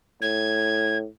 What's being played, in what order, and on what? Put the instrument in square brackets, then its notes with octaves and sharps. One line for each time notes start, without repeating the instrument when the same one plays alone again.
[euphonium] A2 [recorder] G#6